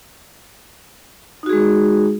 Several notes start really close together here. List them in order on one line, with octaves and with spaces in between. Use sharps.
D#4 F#4 G#4 G#3